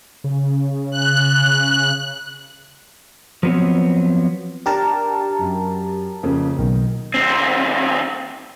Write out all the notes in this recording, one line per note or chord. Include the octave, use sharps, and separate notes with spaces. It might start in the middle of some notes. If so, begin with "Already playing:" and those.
C#3
F#6
F3 F#3 B3 C4 C#5
D4 G4 A#4 A5
F#2
F2 C#3 A#3
B1 D#3
D#2 C4